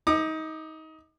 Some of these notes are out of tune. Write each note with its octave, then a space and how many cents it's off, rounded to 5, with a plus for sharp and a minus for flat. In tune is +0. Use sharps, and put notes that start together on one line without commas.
D#4 +25 D6 +45